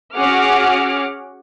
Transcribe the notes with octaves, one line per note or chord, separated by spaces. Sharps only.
C#4 F#4 G#4 F#5 D6 F6